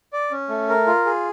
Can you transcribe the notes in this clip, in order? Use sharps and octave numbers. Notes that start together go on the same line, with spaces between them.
D5
C#4
A3
A#4
F4
G#4